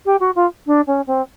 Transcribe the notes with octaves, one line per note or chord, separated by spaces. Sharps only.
G4
F#4
F4
D4
C#4
C4